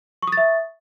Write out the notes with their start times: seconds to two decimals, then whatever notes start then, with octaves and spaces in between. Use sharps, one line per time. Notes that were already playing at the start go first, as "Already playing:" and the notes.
0.22 C#6
0.27 D#6
0.32 A6
0.37 E5